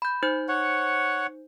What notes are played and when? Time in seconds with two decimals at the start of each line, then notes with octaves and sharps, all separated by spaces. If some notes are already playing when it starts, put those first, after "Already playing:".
0.02 B5 G6
0.23 D#4 C5 G6
0.48 C#5 F#5